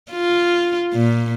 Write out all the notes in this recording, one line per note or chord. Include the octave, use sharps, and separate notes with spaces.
F4
A#2